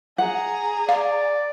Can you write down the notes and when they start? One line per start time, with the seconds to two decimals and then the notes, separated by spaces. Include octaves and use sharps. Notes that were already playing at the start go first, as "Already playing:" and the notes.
0.18 G#4 F#5 A#5
0.89 D5 F5